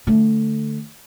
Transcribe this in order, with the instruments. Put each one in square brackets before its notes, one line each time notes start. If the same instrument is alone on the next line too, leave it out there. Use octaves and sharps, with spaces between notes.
[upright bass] D3 A3